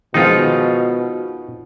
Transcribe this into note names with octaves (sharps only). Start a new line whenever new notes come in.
B2 D#3 F3 G#3 D#4 F4